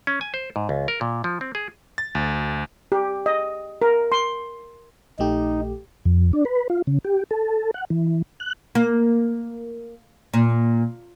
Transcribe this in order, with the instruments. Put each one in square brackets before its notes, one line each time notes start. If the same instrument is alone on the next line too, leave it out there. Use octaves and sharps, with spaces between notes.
[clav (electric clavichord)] C#4
G#5
C5
G#2
C#2
A#4
A#2
F3
C4
G#4
[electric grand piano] A6
D2
[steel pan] G4
D#5
A#4
C6
[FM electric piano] A#1 A3 G4 [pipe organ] D#4
[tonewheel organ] F2
D4
B4
F4
C#3
G4
A4
F#5
E3
F#6
[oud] A#3
A#2